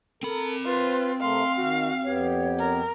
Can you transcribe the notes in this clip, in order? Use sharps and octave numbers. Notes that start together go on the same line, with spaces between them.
C4 A4 A#4 B5
F4 B4 C5
C3 A3 A#4 F5 C6
D#3 F#4
F2 B3 G4 C#5
A#4